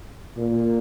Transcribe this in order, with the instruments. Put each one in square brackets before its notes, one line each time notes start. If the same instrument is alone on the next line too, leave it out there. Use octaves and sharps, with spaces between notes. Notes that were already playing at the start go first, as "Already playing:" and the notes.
[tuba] A#2